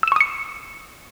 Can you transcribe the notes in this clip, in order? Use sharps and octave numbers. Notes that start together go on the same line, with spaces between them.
C#6 D#6 E6 C#7 E7